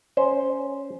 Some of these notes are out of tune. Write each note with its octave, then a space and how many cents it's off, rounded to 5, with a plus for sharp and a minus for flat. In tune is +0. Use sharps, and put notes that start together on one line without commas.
C#4 +0 C5 +0